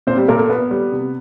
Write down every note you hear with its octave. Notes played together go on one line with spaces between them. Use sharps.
A#2 C4 C5
G3 G4
A#2 A#4
A3 A4
B3 B4
G3
C3